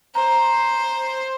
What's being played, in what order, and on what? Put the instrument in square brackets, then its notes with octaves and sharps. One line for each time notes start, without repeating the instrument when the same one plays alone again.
[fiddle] C5 [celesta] A#5